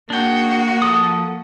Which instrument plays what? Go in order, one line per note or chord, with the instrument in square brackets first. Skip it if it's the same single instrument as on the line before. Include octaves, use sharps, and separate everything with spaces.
[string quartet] A#3 F#4 [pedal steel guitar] D4 G#4 G5
[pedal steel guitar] F3 A4 D#6